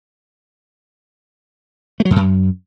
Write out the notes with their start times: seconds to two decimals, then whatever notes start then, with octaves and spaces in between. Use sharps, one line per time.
2.00 A3
2.05 F#3
2.11 F2
2.16 F#2